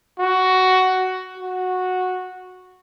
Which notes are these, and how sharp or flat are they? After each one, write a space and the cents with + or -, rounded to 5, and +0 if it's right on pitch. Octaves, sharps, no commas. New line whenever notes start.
F#4 +10
F#4 -10